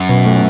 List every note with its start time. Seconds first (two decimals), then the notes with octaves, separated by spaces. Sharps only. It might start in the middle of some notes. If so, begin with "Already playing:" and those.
Already playing: F#2
0.09 B2
0.25 A3